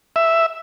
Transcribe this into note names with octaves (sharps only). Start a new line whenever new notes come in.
E5